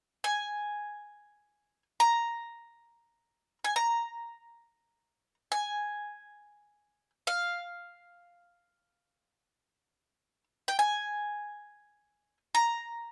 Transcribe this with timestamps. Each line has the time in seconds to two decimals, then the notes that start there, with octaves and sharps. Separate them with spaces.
0.24 G#5
2.00 A#5
3.64 G#5
3.76 A#5
5.52 G#5
7.27 F5
10.68 G5
10.79 G#5
12.55 A#5